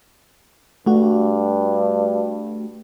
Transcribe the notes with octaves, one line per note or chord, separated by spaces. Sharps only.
G2 A3 F#4